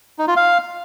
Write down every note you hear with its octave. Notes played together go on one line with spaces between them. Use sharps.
D#4
F4
F5